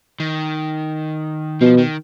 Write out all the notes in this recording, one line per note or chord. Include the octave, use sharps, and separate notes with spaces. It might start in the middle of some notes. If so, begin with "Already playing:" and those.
D#3
B2 F3
D#3